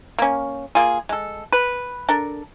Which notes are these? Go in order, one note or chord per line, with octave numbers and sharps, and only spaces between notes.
A#3 C#4
A#3 F4 G#4
G#3 A4
B4
D4 A4 A#4